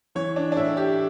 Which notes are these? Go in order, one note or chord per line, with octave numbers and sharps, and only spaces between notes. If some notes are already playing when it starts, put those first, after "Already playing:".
E3 C#5
D4
D4
A2 E4
G4